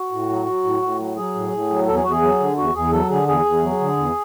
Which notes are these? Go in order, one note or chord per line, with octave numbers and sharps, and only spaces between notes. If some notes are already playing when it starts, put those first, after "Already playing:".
Already playing: F#4
A2
F#3
F#3
A2
A2
F#3
F#3 G#4
A2
A2
F#3
E2 A4
G#4
E2 F#4
G#4
F#3
D3
E2 F#4
E2 G#4
F#3 A4
D3 G#4
E2 G#4
E2
F#3
D3
E2